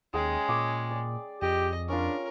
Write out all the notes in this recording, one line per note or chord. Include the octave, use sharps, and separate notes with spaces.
D#2 G#3 C#4 G#4 G5
A#2 C#6 D6
D5
F2 G4 D#5
C#4 D4 F4 A#4